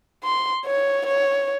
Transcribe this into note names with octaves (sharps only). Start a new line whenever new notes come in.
C6
C#5
C#5